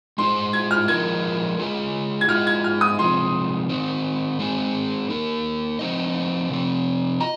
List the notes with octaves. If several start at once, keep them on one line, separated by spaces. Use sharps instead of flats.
G#3 D#4 G#4 C5 C6
G#6
F6
F3 G#3 D#4 A#4 D#5 G#6
G#3 F4 G#4 D#5
G#6
G#3 D#4 G#4 D#5 F6
G#6
F6
D#6
C3 F3 G#3 C6
D#3 C4 D#4
G#3 C4 D#4 G#4
A#3 D#4 A#4
F3 C4 D#4 C5 D#5
C3 F3 C4
D#5 A#5